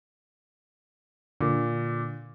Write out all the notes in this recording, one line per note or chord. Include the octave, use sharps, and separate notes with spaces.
A#2 D3